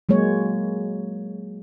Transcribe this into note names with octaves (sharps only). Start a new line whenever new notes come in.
F#3 G#3 A#3 C#5